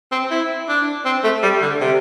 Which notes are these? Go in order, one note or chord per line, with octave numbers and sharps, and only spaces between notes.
C4
E4
D4
C4
A3
G3
D3
C3